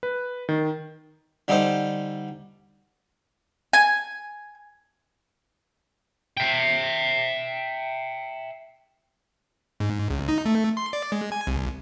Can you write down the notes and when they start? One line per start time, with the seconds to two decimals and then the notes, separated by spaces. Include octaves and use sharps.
0.03 B4
0.49 D#3
1.48 D3 G3 D#4 A4 C5
3.73 G#5
6.37 E5 G5
9.80 G#2
10.10 C#2
10.29 D#4
10.45 A3
10.77 C6
10.93 D5
11.12 G#3
11.32 G#5
11.47 C2